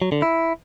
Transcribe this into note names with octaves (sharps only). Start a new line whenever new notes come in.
F#3
D3
E4